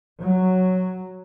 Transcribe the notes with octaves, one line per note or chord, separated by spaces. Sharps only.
F#3